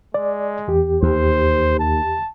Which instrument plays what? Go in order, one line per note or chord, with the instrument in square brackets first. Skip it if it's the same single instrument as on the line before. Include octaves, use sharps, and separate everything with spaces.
[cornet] G#3 [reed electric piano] D5
[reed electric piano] E2 G4
[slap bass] D#2 [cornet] C5
[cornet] A5